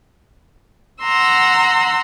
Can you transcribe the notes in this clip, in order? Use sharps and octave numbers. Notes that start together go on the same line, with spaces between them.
F#5 A#5 C6 E6